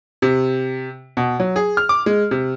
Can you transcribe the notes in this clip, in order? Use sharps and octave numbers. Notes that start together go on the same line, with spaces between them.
C3
B2
F#3
G#4
F6
D6
G#3
C3